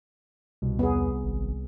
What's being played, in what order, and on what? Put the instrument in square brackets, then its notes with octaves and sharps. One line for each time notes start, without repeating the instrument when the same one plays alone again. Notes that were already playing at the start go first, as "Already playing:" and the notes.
[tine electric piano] C2 [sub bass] B2
[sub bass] E2 [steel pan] B3 G#4
[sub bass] G#1